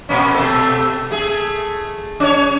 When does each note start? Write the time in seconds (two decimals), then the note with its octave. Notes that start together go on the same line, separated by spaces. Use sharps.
0.09 A#2 A#3 C#4
0.34 B2 A3 A4
1.11 A3 G#4
2.20 C#4 C#5